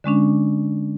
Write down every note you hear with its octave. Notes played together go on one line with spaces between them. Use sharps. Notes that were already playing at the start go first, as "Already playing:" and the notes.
D3 G#3 C#4 D4